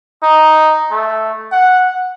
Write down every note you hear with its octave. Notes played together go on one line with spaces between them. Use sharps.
D#4
A3
F#5